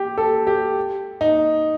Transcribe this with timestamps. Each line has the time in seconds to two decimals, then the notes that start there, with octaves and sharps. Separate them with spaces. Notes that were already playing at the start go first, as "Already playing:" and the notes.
Already playing: G4
0.18 A4
0.47 G4
1.21 D#4